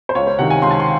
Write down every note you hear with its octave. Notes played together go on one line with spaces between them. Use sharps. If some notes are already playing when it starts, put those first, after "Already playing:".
C5
C#2 C#5
C5
C3 D#3 F#5
G#5
C#2 C6
A5
C6